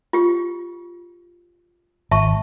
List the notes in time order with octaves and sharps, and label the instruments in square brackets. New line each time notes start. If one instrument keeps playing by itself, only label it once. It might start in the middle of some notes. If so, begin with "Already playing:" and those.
[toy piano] F4 G4
[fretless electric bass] G#1 [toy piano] E5 A5 C#6